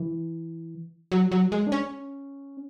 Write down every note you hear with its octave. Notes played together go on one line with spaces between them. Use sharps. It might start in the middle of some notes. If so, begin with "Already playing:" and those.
Already playing: E3
F#3
F#3
G#3
D4
C#4